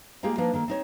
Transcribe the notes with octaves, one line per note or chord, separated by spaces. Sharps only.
G#3 A#3 F4 G4 G#4
F3 A#3 D4 D#4 B4
D#3 A#3 A4
C4 D#4 C#5